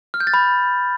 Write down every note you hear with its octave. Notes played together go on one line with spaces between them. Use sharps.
F6
G6
A6
B5